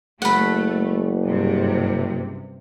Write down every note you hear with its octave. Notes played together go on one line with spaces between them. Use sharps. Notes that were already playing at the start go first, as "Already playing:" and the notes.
F#1 A3 F#5 B5
G2 C3